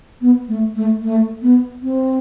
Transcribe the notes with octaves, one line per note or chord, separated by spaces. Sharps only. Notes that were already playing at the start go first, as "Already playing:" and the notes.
B3
A3
A3
A3
B3
C4